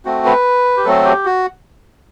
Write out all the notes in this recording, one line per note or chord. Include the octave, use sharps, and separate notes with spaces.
A3 C4 F#4
B4
G4
F#3 A3 C4 F#4 A4
G4
F#4